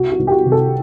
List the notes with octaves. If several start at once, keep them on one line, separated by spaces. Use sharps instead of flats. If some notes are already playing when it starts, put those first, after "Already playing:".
Already playing: C2 F#4
F#4
C2
G4
F#4
C3
A4